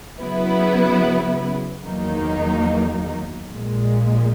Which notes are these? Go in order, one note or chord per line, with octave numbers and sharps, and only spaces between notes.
C#3 F#3 B3 E4 B4
E2 D#3 F#3 A#3 D#4
A#1 A#2 G#3